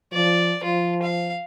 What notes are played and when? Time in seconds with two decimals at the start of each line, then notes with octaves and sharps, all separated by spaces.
0.13 F3 D5
0.64 F3 F4
1.03 F5